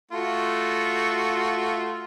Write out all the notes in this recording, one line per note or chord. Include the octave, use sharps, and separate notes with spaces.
A3 F4 F#4